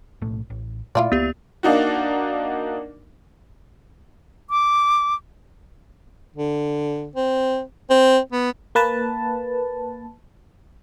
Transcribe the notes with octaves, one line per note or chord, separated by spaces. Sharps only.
B1 A2 A3
A1
A#2 A3 E4 F4 D5
C#2 G#3 A#3 B3 G4
A#3 D4 D#4 F#4
D6
D3
C4
C4
B3
A#3 B4 A5